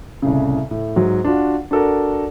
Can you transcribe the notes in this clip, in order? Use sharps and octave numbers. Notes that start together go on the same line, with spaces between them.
C2 A2 C#3
A2
G#2 F#3
D4 F4 F#4
D4 F#4 A4 A#4 D5